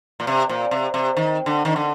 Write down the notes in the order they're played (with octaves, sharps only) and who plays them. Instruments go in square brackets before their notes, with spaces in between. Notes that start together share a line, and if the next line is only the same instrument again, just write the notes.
[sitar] A#2
C3
A#2
C3
C3
D#3
D3
D#3
D3